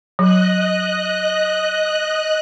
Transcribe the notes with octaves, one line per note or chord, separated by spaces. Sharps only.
F#3 D#5 F#6